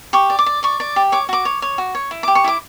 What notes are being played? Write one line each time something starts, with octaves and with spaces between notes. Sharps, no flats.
G4 C#6
D5
D6
D5
D5 C#6
D5
G4
C#5 D6
F#4 D6
C#5
C#5
F#4
C#5
E4
G4 D6
C#6
E4 D6